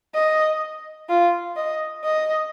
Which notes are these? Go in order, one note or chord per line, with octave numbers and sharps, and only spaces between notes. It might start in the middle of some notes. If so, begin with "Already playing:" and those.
D#5
F4
D#5
D#5